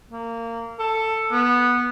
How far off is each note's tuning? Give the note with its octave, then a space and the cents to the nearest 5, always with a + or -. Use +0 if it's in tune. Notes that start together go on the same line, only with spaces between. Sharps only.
A#3 -20
A4 +10
B3 -10